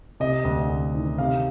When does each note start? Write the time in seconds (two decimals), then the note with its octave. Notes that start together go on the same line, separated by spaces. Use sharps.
0.20 C3 D#5
0.44 D2
0.69 D2
0.95 D#3
1.18 C3 F5